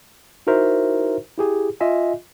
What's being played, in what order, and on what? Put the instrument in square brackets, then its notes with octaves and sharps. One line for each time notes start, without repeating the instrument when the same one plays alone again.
[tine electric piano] D#4 E4 F#4 A#4 C5 E5
E4 G4 G#4
F4 D#5 E5 G#5